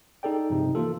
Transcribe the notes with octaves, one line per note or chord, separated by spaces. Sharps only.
D#4 G#4 A4 D5 G5
G2 C3 F3 D#4
E3 A#3 F4 A4